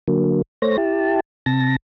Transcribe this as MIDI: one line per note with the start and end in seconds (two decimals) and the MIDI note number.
0.08 0.42 50
0.08 0.42 54
0.08 0.42 58
0.62 0.77 57
0.62 0.77 72
0.62 0.77 73
0.62 0.77 94
0.78 1.20 64
0.78 1.20 67
0.78 1.20 81
1.46 1.76 48
1.46 1.76 81
1.46 1.76 94